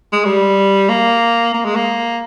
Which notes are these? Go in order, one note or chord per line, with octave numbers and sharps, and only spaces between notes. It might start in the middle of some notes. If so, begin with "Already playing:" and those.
G#3
G3
A#3
A#3
G#3
A#3